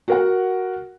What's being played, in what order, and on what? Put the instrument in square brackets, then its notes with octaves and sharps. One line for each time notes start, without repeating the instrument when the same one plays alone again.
[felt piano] F#4 A#4 F#5